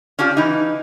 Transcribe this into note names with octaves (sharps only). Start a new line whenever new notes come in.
C#4 D4 F4 G4
E3 D#4